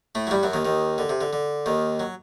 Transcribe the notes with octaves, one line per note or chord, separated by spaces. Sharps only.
A2 A3
F#3
G2 G3
F#2 F#3
D#2 D#3
D#2 D#3
D3
C3
D3
D3
D#2 D#3
F#3